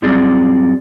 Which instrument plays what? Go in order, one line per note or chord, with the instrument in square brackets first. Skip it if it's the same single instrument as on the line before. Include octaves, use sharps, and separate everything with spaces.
[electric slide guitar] F#2 G3 C4 F4 G#4 D5